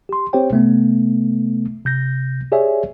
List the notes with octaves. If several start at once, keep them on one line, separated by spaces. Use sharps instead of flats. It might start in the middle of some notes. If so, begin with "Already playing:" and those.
G4 C6
C4 G4 C5 C#5 G5
C3 A3 B3
C3 G6 A#6
G4 G#4 C#5 D5 E5 G#5